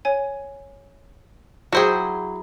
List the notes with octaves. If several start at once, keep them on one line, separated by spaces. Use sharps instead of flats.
C#5 G#5
F#3 E4 F#4 G#4 C5 G5